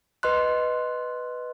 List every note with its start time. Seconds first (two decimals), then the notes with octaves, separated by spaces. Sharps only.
0.23 B4 D#5 C6 F#6